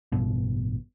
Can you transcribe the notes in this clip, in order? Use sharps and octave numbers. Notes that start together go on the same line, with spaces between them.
A1 G2 B2